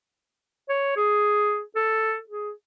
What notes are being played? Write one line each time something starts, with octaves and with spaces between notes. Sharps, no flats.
C#5
G#4
A4
G#4